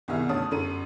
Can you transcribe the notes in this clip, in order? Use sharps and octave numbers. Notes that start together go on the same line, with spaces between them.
C2 B2 D#3 G#4 E5 F6
G1 D2 C#4 A5 D#6
G1 F#2 A4 D#7